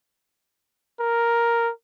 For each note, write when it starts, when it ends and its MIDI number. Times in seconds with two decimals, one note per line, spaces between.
1.00 1.70 70